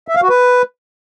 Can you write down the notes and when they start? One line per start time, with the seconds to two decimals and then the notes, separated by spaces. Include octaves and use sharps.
0.08 E5
0.15 F5
0.22 F#4
0.29 B4